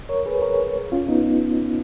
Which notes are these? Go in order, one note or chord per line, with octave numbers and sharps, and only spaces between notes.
A#4 C#5
G#4 B4
A#4 C#5
C#4 F4
B3 D#4